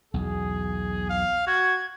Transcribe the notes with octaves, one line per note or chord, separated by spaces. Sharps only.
B1 E2 G#4
F5
F#4 G#6